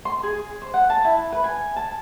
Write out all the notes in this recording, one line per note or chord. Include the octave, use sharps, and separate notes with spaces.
C6
G#4
C5
F#5
A5
E4
B4
G#5
A5